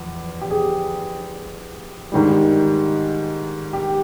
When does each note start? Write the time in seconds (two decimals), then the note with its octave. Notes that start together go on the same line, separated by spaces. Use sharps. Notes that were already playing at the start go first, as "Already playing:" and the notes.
Already playing: E2 F3
0.42 G4
0.51 G#4
2.12 G#2 D#3 G3
3.73 G4